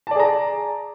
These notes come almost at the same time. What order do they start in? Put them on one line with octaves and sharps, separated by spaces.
A5 D5 G#4 A#5